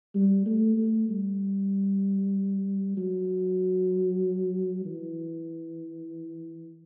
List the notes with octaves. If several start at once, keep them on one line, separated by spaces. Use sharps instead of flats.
G3
A3
A3
G3
F#3
E3